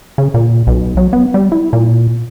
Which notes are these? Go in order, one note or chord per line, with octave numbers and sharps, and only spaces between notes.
C#3
A#2
B1
F#3
B3
G3
E4
A#2